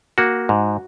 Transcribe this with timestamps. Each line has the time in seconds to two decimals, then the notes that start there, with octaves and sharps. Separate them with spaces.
0.18 A#3 F#4
0.49 G#2